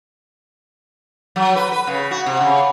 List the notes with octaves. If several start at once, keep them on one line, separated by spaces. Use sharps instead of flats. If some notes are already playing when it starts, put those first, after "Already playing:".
F#3
B4
B4
C#3
F#4
C3
C#3